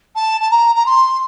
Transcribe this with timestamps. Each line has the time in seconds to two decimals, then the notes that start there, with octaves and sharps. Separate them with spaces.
0.16 A5
0.41 A5
0.51 A#5
0.75 A#5
0.86 C6